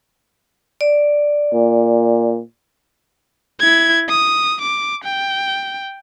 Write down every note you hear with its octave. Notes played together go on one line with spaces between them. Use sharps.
D5
A#2
E4 G#6
D#6
D6
G5